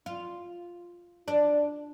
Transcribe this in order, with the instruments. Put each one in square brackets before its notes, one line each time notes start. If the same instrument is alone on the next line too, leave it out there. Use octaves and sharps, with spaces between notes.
[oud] F4
D4